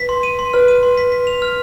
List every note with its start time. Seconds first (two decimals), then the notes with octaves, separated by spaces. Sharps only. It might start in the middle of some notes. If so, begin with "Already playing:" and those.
Already playing: B4 B6
0.09 C6
0.23 D#7
0.39 C6
0.53 B4 F6
0.68 D#7
0.83 C6
0.97 B6
1.12 B6
1.27 F7
1.42 F6